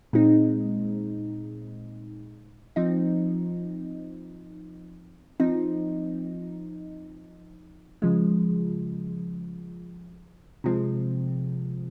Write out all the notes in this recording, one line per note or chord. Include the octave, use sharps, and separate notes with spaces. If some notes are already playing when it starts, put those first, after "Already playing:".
A#2 G#3 C4 D#4
F3 C4 D#4
F3 C4 D#4
C#3 F3 G#3
C3 F3 G#3 C4